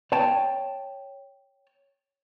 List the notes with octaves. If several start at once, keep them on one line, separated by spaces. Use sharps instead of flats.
C#5 G5 A5